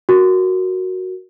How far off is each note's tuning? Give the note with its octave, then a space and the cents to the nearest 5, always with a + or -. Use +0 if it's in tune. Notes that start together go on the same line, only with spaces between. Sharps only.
F#4 +0 A#4 +0